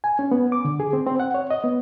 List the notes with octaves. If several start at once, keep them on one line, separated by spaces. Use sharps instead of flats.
G#5
C#4
B3
D6
D3
G#4
C4
C4
F#5
C#5
D#5
B3